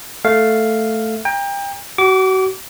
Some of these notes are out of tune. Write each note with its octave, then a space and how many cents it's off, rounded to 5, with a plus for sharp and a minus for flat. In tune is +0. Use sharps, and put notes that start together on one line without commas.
A3 +0 F5 +0
G5 +30 A#5 +20
F#4 +35 D6 -25